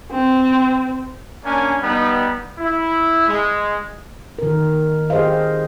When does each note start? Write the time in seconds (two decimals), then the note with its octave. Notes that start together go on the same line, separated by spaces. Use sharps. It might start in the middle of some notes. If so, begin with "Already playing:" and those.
0.11 C4
1.44 A#3 C#4 D4 G#5
1.81 G3 B3 D#4 B4 B5
2.58 E4
3.26 G#3
4.39 D#3 A#4
5.10 G4 G#4 C5 D#5 F5